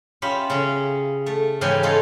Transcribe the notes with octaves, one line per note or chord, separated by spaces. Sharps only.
C#4 F4 G4 E5 B5
C#3 C#4
A3
G#2 C#3 E3 C#4 G4 G#5
G#3 C#4 D#4 F4 G#4 A4